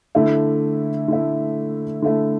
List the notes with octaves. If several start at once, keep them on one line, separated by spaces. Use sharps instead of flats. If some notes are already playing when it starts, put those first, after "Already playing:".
D3 A3 E4
D3 A3 E4
D3 A3 E4